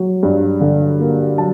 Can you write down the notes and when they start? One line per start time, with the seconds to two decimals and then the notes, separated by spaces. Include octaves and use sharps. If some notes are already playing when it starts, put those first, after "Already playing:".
Already playing: F#3
0.23 G2
0.61 D3
1.00 A#3
1.38 F#3 A5